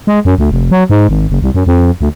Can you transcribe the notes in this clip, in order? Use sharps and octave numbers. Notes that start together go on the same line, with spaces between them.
G#3
F#2
D2
F1
F#3
G#2
G#1
F#1
C2
F#2
F2
D2